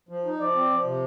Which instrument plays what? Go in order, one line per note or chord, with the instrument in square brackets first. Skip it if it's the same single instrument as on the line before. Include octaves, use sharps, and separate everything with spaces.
[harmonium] F3
D#4
[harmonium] F3 [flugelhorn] D5
[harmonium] C4
F3
C3